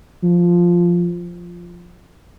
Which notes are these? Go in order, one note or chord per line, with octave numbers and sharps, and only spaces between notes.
F3